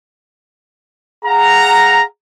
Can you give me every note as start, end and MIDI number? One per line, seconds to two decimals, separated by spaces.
1.25 2.04 68
1.25 2.04 77
1.25 2.04 78
1.25 2.04 82